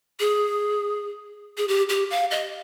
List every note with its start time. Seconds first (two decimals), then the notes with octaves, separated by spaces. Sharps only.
0.20 G#4
1.57 G#4
1.68 G4
1.89 G4
2.10 F5
2.31 D#5